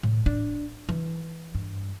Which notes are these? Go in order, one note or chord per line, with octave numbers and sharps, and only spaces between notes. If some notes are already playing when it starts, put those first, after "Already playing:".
A2
D4
E3
G2